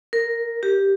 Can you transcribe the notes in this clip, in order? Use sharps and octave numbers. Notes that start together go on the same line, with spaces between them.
A#4
G4